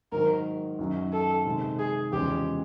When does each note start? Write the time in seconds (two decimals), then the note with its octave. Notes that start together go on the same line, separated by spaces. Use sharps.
0.12 G#2 D#3 F#3 A#4
0.79 F#2 D#3 F#3
1.12 A4
1.45 C3 D#3 G#3 C4
1.79 G#4
2.12 E2 C#3 F3 G#3 C#4 G4